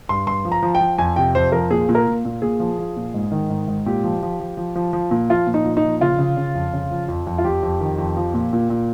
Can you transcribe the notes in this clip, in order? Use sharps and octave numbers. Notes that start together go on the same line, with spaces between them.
G2 C6
G2 C6
F3
A#5
F3
G5
F3
F2 G#5
C3 G5
F2 C5
F3 A#4
A#2 G#4
A#2
A#4
A#2
A#2
A#2 G#4
F3
F3
A#2
G#2
D#3
G#2
G#2
A#2 G4
F3
F3
F3
F3
F3
F3
A#2
F3 F4
A#2
D#4
A#2
D#4
F3
C#3 F4
C#3
C#3
F2
C#3
F3
F2
F2
F4
F2 G4
F2
D#3
F2
F3
A#2
A#2
A#2